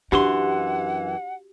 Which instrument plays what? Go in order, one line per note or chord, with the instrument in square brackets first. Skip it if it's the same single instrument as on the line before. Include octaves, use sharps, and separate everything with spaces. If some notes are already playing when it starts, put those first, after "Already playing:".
[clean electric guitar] F#2 E3 C6 [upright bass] D4 [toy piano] F#4 G4 [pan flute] F#5